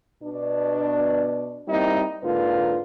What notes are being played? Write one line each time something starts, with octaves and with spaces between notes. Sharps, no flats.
B2 D4
G3 A#3 C4 D#4 E4
G#2 D3 A#3 F4 B4